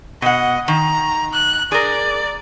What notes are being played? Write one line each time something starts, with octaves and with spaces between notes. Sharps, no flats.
B2 D#5 F#5
D#3 A#5
F#6
G#4 A#4 D5